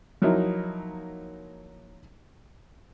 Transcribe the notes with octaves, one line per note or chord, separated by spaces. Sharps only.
F3 F#3 A#3 D#4 E4